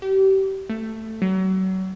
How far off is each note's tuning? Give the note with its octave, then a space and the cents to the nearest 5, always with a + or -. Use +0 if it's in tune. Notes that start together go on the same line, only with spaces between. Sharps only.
G4 -30
A3 +10
F#3 +35